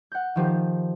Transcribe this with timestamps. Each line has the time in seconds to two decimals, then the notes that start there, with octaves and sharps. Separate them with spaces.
0.12 F#5 G6
0.36 D#3 F3 G4